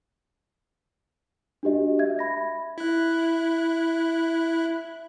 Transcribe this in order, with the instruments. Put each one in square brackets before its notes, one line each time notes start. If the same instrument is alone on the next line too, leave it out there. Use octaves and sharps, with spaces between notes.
[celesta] D4 F#4 G4 D#5
E5 G#6
E5 B5 A#6
[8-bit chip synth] E4 F#6